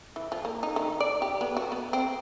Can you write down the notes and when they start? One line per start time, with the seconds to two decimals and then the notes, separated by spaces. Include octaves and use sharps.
0.16 E3
0.32 F3
0.45 A#3
0.63 D#4
0.76 D#3
1.00 D5
1.22 G4
1.41 B3
1.57 F#4
1.72 B3
1.93 C4